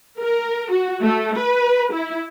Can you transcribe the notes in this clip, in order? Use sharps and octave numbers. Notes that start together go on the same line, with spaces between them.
A#4
F#4
A3
B4
E4